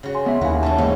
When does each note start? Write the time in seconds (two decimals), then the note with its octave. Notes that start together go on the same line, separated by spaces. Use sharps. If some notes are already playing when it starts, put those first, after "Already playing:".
0.03 C#3 F#4
0.14 G#5 C6
0.26 B3 D#5 E5
0.41 D#2 D#3 E4 F#4 E5 F5 G#5
0.63 E3 A3 C#4 A5
0.78 G#2 E3 A3 A#3 D#5 F5